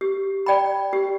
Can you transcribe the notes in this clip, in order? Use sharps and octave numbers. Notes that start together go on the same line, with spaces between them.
G4
D5 G5 B5
G4